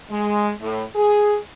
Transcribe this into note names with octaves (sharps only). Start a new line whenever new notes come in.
G#3
A2
G#4